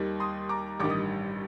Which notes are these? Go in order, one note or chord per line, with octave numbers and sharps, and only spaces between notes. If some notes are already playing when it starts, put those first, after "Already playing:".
Already playing: D#2 D#3 G3
C6 D#6
A#5 D6
A1 G2 D#3 G3 D6
D#6